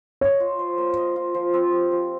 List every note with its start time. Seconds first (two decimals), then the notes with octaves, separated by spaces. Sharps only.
0.21 C#5 D#5
0.40 F4
0.59 C5
0.78 A#3
0.97 D#5
1.16 F4
1.34 F3
1.54 C4
1.72 G4
1.92 F3